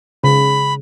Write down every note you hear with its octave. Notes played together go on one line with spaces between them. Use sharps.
C#3 B5